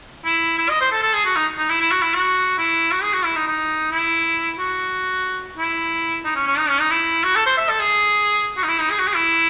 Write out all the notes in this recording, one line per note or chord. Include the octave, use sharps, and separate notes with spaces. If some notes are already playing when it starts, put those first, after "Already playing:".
E4
E4
D#5
C5
A4
A4
G#4
F#4
D#4
D#4
E4
E4
F#4
E4
F#4
E4
F#4
G#4
F#4
E4
D#4
D#4
E4
F#4
E4
D#4
C#4
C#4
D#4
C#4
D#4
E4
F#4
A4
C5
E5
A4
G#4
F#4
D#4
E4
D#4
G#4
F#4
G#4
E4